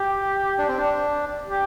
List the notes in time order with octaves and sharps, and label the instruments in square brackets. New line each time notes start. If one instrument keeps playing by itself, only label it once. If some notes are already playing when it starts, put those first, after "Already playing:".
Already playing: [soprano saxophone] G4
[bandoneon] D4
C4
D4
[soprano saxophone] G4